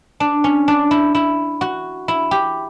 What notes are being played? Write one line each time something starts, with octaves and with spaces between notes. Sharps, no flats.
D4
C#4
D4
E4
E4
F#4
E4
G4